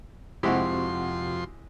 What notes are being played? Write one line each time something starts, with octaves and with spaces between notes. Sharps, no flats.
F2 C3 G#3 E4 F#4 G4 C6